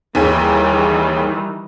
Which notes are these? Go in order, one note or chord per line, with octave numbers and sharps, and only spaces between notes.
D#2 D#3 E3 G3 G#4 D#7